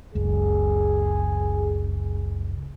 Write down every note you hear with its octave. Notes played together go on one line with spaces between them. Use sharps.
F#1 C#2 G#4